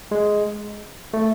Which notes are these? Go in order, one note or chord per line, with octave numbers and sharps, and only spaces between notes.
G#3
A3